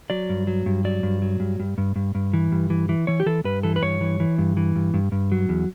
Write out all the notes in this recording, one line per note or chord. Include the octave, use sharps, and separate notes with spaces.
F#3 D5
G2
F#3
G2
F#3 D5
G2
F#3
G2
G2
G2
G2
G2
E3
G2
E3
E3
E3 C#5
G4
E3 A4
G2 B4
E3 A4
B4
G2 C#5
E3
E3
G2
E3
G2
G2
G2
F#3
E2